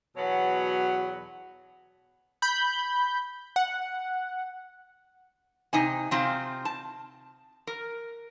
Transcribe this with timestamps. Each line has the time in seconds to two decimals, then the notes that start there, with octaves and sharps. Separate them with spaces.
0.16 E2 B2 F#3 B3 C#5 F#5
2.42 B5 G6
3.56 F#5
5.73 C3 D#4 G#5
6.11 C3 C4 D#4 F4
6.65 A5
7.67 A#4